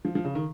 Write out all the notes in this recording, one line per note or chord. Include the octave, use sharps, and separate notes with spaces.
F3
F3
C#3
D#3